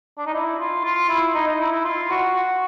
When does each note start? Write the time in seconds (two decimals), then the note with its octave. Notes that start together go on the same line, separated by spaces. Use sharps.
0.18 D4
0.26 D#4
0.34 E4
0.59 F4
0.84 F4
1.09 E4
1.35 D#4
1.47 D#4
1.60 E4
1.72 E4
1.85 F4
2.10 F#4
2.35 F#4